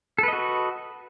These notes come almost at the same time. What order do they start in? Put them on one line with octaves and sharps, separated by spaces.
A4 B4 D#5 F#4